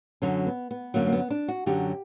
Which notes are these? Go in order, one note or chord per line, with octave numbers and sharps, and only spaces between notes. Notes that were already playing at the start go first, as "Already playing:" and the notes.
F#2 D3 F#3 C#4
B3
B3
F#2 D3 F#3 A#3
A#3
B3
D4
F#4
F#2 D3 F#3 G4